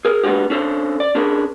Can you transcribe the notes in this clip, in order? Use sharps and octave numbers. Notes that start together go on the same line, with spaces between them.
G#4 A#4
G#3 B3 D4 F#4 G4
C#4 D4 A4 A#4 C5
D5
C#4 D4 G#4 A#4